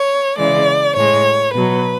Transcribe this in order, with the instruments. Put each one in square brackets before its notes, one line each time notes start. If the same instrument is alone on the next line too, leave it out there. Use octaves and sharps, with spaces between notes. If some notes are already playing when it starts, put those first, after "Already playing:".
Already playing: [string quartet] C#5
C#3 E3 G#3 D5
A2 G#3 C#5
B2 F#3 B4